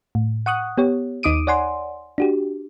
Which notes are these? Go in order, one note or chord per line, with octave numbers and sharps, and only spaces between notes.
A2
F#5 C#6 D#6 F#6
B3 G4 C#5
D#2 D#4 D6 D#6 D7 D#7
C#5 D5 F#5 G#5 C6
D4 F#4 G4